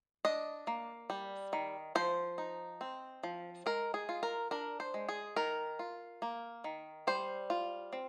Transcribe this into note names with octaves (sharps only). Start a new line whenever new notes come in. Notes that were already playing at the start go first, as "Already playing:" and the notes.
D4 D#5
A#3
G3
D#3
F3 C5
D#4
C4
F3
G#3 A#4
G#4
F4
A#4
D4 A#4
C5
G#3
G#4
D#3 A#4
F4
A#3
D#3
G3 C5
F4
C4